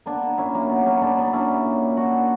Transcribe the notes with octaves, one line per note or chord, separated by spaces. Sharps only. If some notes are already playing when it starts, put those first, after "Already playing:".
A#3 B3 D4
A#3
A#2 C#4 E4
F#3 A#3
F#3 B3
F#3 A#3 C#4
A#3 B3 D4
F#3 B3 D4
A#3 C#4 E4
A#2
A#2
A#2
A#2 D4 F#4
A#2